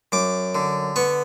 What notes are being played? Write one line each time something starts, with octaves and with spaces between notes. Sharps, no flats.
F#2 D6
D3
B3 C#6